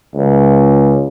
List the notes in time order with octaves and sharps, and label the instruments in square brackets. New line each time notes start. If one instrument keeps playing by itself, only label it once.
[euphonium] C#2